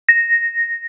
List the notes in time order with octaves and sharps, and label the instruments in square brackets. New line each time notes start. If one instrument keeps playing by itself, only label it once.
[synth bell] A#6